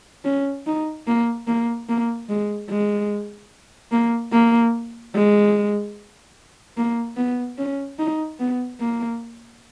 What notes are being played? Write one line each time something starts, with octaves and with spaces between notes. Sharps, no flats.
C#4
D#4
A#3
A#3
A#3
G#3
G#3
A#3
A#3
G#3
A#3
B3
C#4
D#4
B3
A#3